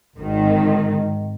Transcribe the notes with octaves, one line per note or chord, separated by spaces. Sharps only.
G#1 G#2 D#3